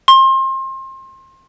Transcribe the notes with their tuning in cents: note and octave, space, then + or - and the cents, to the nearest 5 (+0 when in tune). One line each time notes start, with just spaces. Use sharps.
C6 +30